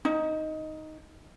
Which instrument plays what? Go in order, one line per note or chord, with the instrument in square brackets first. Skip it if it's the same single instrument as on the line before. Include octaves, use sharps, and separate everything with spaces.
[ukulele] D#4